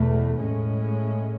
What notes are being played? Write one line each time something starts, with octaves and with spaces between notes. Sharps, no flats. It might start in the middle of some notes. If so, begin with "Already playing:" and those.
Already playing: E2 B2 A3
A2 G#3 C#4